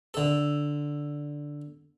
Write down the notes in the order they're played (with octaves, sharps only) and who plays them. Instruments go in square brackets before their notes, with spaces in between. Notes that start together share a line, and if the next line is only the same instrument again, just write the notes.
[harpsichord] D3 A4